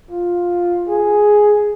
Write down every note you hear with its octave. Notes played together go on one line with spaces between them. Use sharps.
F4
G#4